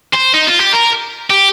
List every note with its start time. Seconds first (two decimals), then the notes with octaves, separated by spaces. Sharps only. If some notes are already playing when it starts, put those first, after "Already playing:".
0.15 C5
0.34 D#4
0.47 F4
0.59 G4
0.73 A#4
1.30 G4